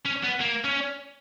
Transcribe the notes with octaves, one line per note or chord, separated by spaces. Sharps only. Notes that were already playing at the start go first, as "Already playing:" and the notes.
C#4
B3
A#3
C#4